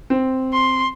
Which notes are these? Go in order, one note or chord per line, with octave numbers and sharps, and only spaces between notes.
C4
C6